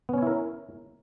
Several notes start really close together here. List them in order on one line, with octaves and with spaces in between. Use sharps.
B3 C#4 C#5 E4 A#4